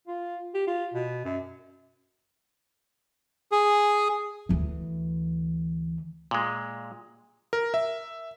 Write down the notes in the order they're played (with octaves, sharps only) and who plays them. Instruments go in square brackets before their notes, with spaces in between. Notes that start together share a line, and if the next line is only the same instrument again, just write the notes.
[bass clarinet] F4
G4
F4
B2
F#2
[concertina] G#4
[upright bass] D2 E3
[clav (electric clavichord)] A#2 G#3
[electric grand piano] A#4
E5